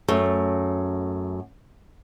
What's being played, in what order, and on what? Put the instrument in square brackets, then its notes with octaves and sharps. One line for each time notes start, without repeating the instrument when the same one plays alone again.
[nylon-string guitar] F#2 A3